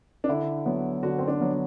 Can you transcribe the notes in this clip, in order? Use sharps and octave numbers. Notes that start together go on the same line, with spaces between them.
D4
D3 E4
F#3 B3
D3 F#4
C4
D4
F#3 B3